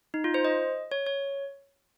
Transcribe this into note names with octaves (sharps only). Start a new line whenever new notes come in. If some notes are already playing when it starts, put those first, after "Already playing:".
D#4
F4
C5
D#5
C#5
C#5